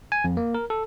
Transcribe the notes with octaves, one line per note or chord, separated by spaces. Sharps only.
G#5
F2
A#3
A#4
A4